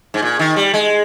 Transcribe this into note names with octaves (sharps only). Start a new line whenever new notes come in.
G#2
A#2
D#3
G3
G#3